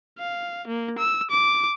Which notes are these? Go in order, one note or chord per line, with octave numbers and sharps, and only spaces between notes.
F5
A#3
E6
D6